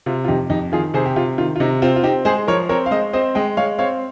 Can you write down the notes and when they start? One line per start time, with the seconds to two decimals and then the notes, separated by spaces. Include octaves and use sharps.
0.06 C3 F4
0.25 F4
0.28 F2 D#4 G4
0.50 F2 D#4 G4
0.72 D#3 F4 G#4
0.94 C3 G#4 C5
1.06 G4
1.16 C3 F4
1.38 D#3 F4
1.56 F4
1.60 C3 D#4
1.82 C4 F4
1.96 F4
2.03 C4 D#4 G4
2.25 G#3 G#4 C5
2.48 F3 A#4 C#5
2.69 C4 A#4 C#5
2.86 F5
2.91 G#3 C5 D#5
3.13 C4 C5 D#5
3.35 G#3 D#5 G5
3.57 G#3 C#5 F5
3.79 C4 C#5 F5